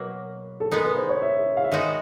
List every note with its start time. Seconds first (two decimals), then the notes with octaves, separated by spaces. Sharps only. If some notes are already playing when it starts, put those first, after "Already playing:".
Already playing: B2 F#3 A#3 B4
0.60 A4
0.71 G#3 B3 D#4 A#4
0.84 B4
0.97 C5
1.09 C#5
1.22 E5
1.57 F5
1.64 E5
1.71 D#3 G#3 B3 D#4 F#4 D#5